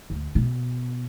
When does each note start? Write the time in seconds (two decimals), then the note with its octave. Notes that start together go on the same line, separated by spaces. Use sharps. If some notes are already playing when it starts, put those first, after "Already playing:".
0.10 D2
0.35 B2